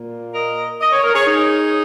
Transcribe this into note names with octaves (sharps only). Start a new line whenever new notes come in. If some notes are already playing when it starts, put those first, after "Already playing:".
Already playing: A#2 A#3
A#4 D#5
D#5
C#5
A#4
G#4 C#5
D#4 G#4